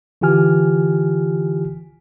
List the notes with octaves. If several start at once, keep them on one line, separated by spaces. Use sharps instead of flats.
D3 E3 F4 G4 G#5 F6